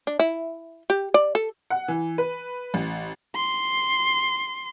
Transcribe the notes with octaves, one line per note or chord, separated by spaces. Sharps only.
D4
E4
G4
D5
A4
F#5
E3
B4
A1
C6